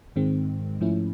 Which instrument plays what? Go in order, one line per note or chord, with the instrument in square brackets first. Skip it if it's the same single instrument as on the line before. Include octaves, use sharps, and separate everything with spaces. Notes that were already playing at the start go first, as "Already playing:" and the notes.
[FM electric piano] G#2 D#3 G#3 C4
G#2 F3 A3 C#4 E4